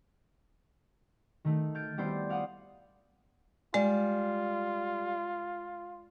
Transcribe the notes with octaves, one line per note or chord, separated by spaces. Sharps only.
D#3 A3 D#4
F6 G6 A6 D7
G3 A3 B3 E4 C5 D5
D5 F5 F#5 D#6
G3 G#3 F4